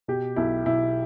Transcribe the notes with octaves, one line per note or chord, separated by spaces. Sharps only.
B2 G4
B1 E4
B1 E4